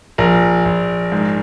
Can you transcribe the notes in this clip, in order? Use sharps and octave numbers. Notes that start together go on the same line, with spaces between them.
A#1 A#4
A#1
G#2